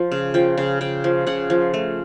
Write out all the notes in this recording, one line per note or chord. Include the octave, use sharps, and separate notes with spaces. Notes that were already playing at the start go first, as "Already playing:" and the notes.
Already playing: F3
C#3
F3 G5
C#3
C#3 G5
F3
C#3 F#5
F3
A3